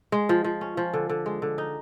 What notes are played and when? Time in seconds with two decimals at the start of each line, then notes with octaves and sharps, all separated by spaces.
0.12 G#3
0.29 F3
0.44 F3
0.61 C#4
0.77 F3
0.93 D3
1.09 D3
1.26 G#3
1.42 D3
1.58 D#4